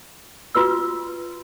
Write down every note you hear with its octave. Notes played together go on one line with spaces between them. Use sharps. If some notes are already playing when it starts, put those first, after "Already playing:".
F4 F#4 B4 E6